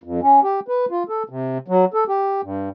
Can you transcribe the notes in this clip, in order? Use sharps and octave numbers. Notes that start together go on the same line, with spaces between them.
F2
C#4
G4
B4
F4
A4
C3
F#3
A4
G4
G2